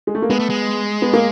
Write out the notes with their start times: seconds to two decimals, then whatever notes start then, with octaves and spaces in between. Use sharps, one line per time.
0.07 G#3
0.15 A3
0.22 A#3
0.30 G#3 B3
0.39 A3
0.50 G#3
1.02 B3
1.13 A#3